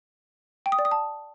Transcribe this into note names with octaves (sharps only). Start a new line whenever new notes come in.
G5
D#6
D5
D#6
A5